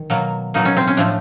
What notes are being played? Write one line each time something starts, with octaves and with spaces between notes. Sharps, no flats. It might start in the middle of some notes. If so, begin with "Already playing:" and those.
Already playing: D#3
B2 F#3 A#3
B2 F#3 A#3 D#4
C#4
C4
C#4
A2 F3 A3 D4